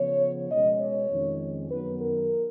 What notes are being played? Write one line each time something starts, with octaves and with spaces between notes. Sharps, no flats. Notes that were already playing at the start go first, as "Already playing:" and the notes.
Already playing: C#3 F3 B3 C#5
B2 G#3 C#4 D#5
C#5
F2 D#3 G#3 C#4
F#2 D#3 F#3 B3 B4
A#4